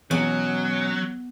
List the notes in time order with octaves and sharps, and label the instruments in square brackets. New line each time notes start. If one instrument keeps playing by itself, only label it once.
[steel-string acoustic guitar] B2 [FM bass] E3 [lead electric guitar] F#3 [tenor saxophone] C#4